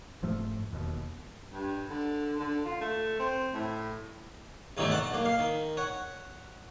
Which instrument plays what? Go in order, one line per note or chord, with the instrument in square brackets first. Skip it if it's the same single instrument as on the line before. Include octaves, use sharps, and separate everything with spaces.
[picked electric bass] F1 G#2 F3 A3
E1 D#2 B2
[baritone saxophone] G2
D3
D3
F4
A3
C4
A2
[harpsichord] G2 B2 D#3 E3 F#3 A3
F#5 A5
B1 A#3
F5
D#3
C#5 F#5